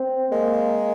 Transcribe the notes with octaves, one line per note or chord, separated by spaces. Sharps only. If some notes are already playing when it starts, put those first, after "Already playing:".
Already playing: C4
G#3 A#3